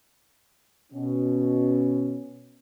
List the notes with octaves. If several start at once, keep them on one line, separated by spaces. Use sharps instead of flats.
B2 C#4